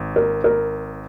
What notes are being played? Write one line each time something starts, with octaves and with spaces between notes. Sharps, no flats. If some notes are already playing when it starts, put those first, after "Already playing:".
Already playing: G#1
A#4
A#4